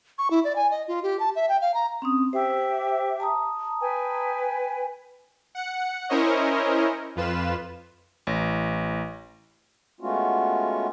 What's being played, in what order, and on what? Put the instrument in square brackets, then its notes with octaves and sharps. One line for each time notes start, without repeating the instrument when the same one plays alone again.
[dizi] C#6
E4
D5
G#5
D#5
F4
G4
A5
E5
G5
F5
A#5
[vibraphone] C4 C#4 D#6
[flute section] G4 E5 [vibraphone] C5 E6
[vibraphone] A5 A#5 D#6
[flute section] B4 G5 G#5
[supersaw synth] F#5 C#7
C#4 E4 A#4 C5 C#5 D#5
F2 F4 B4 E7
[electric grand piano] A1
[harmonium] G#3 A3 B3 C#4 F4 F#4